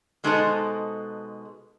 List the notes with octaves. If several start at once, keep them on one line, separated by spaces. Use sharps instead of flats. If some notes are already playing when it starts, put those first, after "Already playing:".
B2 G#3 D#4 A4 C5 A5